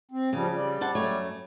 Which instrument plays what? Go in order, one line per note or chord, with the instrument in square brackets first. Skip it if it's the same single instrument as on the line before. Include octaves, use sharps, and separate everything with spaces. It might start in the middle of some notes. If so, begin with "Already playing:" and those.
[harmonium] C4
[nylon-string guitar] C#3 [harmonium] F3 G3
[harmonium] G3 D5
[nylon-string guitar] C5 F#5 A5
F#2 A3 C#5